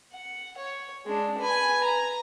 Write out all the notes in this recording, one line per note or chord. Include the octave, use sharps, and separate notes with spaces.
F#5
C#5
G#3 D4
B4 G#5
A#5